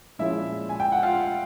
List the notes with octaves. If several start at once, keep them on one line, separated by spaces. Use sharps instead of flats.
A#2 F3 G#3 C#4 E4 E5
G#5
G5
F#5
F4 F5